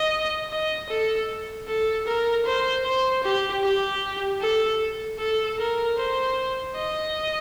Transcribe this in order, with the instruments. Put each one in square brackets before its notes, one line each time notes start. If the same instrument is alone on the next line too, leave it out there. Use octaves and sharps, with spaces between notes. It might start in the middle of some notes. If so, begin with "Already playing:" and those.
Already playing: [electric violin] D#5
D#5
A4
A4
A#4
C5
C5
G4
G4
A4
A4
A#4
C5
D#5